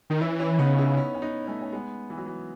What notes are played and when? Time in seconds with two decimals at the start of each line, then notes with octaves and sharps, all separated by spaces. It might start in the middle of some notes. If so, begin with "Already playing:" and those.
0.10 D#3 D#4
0.21 E3 C#4 E4
0.39 C#4 E4
0.59 C#3 B3 D#4
0.78 C#4 E4
0.97 C#4 E4
1.14 C#4
1.22 B3 D#4
1.47 A3 C#4
1.61 C#4
1.72 G#3 B3
2.10 E3
2.18 F#3
2.26 E3